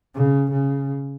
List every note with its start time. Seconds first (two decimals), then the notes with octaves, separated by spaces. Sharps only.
0.15 C#3
0.52 C#3